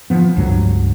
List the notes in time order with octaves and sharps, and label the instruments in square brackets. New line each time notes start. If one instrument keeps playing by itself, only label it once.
[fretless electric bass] F3 B3
C#2 G2 F#3